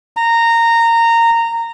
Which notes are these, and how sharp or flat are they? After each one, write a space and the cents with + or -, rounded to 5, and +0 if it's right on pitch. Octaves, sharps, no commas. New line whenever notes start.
A#5 -15